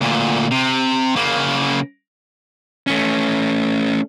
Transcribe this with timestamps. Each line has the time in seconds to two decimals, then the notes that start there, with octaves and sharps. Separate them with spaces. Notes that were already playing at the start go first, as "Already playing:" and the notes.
0.02 D2 A#2
0.51 C3
1.16 C#3 A#3
2.87 A3 C#4